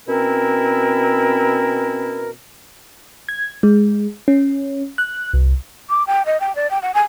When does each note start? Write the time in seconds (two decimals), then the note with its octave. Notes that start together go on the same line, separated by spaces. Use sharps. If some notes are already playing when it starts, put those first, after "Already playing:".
0.07 B2 C4 C#4 E4 A#4
3.29 G#6
3.63 G#3
4.28 C#4
4.98 F#6
5.34 C2
5.89 D6
6.07 G5
6.26 D#5
6.40 G5
6.55 D5
6.71 G5
6.82 F#5
6.94 G#5